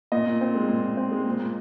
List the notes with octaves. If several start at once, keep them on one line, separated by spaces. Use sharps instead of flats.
A#2 D#5
A#2
C4
G#3
A#2
A#2
C4
G#3
A#2
A#2